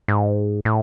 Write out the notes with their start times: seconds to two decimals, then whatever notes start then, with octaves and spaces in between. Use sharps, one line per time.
0.08 G#2
0.65 A2